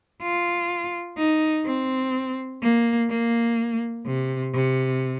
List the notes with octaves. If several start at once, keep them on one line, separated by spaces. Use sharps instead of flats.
F4
D#4
C4
A#3
A#3
C3
C3